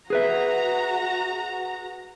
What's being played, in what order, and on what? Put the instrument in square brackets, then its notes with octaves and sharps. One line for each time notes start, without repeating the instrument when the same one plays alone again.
[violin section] F#4 A#5 [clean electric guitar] G#4 B4 E5